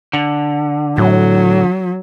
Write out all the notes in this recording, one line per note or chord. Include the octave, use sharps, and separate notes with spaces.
D3
A2 F#3